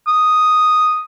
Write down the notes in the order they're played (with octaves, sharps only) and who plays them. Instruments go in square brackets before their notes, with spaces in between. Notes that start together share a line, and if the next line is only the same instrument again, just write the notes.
[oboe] D#6